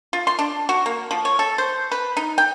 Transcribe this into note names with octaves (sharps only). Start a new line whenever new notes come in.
F4
C6
D4
F#4
A#3
F3
C#5
A4
C5
B4
D#4
G5